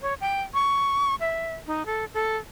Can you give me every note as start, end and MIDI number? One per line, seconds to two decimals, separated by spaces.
0.01 0.14 73
0.21 0.42 79
0.54 1.15 85
1.20 1.53 76
1.67 1.86 63
1.86 2.05 69
2.14 2.36 69